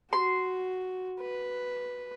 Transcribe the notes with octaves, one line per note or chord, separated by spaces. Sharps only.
F#4 C6
B4